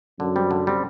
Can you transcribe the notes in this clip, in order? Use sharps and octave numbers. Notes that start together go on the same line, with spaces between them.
F#2 D3
G3 C4
D3
G3 C4